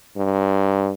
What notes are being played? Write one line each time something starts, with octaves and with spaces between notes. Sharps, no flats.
G2